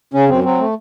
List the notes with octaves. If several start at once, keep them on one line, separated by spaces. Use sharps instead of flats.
C#3 C#4
F#2 C4
F#3 C4
A3